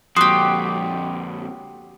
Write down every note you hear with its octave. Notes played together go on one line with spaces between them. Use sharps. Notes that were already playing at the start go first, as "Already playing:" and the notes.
F2 A#2 F#4 G4 C6 D#6 C7